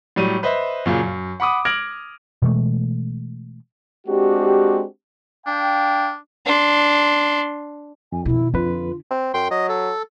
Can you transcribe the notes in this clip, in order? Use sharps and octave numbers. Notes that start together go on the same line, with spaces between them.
A2 F#3 G3 D#7
B4 C5 D#5 E5
F#2 A#2 C#3
F#2
F#5 B5 D6 D#6
F6 G#6 A#6 D7 F#7
B2 E3 G#3 A3
G#3 C4 D4 F#4 G4
D4 F5 G5
D4 C6
F2 G#5
B2 D#3 E4
F2 D3 F4 B4
C4
F#2 G5 C6
F#3 D#5
A4